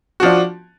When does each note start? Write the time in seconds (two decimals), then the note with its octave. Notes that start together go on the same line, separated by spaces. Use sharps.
0.20 F#4
0.23 F3
0.25 D4